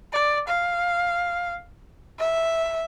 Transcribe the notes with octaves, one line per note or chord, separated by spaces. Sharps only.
D5
F5
E5